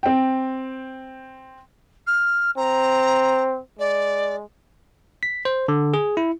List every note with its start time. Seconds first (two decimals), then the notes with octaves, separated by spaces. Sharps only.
0.03 C4 G5
2.07 F6
2.57 C4 A#5
3.79 G#3 D5
5.23 B6
5.45 C5
5.68 D3
5.94 G#4
6.17 E4